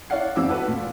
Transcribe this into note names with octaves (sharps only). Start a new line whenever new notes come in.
E4 C#5 D5 F5 F#5 C7
G1 E2 E3 C4 D6 E6
F#4 A4 B4 F#5 A5
A#2